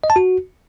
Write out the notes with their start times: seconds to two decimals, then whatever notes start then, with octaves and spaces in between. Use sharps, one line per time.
0.04 D#5
0.10 A5
0.16 F#4